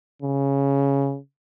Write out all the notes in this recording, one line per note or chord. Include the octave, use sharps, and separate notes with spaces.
C#3